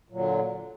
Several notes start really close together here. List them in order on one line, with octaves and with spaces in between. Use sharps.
A#2 F#3 D3